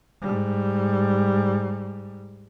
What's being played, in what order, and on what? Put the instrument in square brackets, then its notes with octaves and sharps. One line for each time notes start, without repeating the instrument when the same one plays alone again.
[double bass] G#2 G3